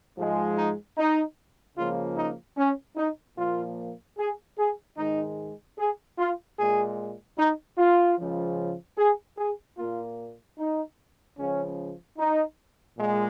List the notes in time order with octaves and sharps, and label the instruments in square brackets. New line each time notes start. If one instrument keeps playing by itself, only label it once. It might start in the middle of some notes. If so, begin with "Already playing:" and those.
[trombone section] G#2 F3 G#3
D#4
D#4
C#2 C#3 F3 A#3 F4
D#4
C#4
D#4
A#2 F3 A#3 F4
G#4
G#4
G#2 D#3 G#3 D#4
G#4
F4
A#2 G#3 G#4
D#4
F4
C#2 C#3 F3
G#4
G#4
A#2 A#3 F4
D#4
C#2 C#3 F3 C#4
D#4
A#2 G#3